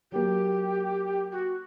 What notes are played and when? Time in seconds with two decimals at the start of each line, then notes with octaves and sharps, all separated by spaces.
0.12 F#3 A#3 G4
1.32 F#4